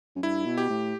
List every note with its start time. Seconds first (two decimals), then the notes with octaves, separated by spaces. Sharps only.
0.16 F#2
0.23 G2 E4
0.46 B2
0.58 G4
0.70 A2